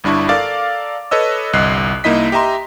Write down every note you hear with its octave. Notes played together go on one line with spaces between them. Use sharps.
G1 G2 D4 E4 C#6
A4 A#4 D5 F5 D6 A6
A4 B4 C#5 D#5 E6
G1 C2 D#5 F#6 C7
C2 A#3 D#4 E4 D#5 B6
G4 D#5 E5 A#5 C6